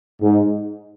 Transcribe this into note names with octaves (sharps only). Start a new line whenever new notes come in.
G#2